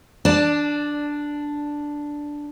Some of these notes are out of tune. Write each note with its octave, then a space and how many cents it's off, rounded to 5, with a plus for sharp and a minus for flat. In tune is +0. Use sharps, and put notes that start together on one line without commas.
D4 +0 D5 +0 A5 -20